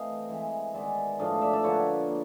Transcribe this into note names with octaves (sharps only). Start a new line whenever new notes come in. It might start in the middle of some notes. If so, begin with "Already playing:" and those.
Already playing: E3 A3 C4 D#5 F5
E3 G#3 C4
D#3 G#3 B3 D5 E5
A2 F3 A3 D4 D#5 F5
D5 E5
D5 E5
D3 F3 A#3 D4 B4 C#5
A#3